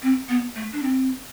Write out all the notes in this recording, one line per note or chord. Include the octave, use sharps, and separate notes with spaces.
C4
B3
A3
D4
C4